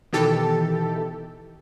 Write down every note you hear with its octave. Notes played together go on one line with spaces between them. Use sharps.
B2 D#3 E3 G4 A4